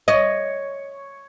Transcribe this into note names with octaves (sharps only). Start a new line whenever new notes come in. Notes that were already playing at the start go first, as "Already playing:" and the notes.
C#5 D#5